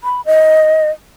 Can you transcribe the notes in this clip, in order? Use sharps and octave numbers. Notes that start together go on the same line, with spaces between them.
B5
D#5